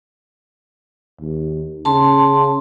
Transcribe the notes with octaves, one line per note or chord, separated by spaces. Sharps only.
D#2
C#3 A5 C6